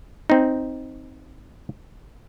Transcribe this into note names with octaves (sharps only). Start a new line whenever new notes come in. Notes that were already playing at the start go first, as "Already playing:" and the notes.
C4 D#4